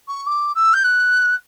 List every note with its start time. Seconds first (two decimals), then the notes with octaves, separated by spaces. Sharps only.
0.08 C#6
0.27 D6
0.55 E6
0.74 G6
0.84 F#6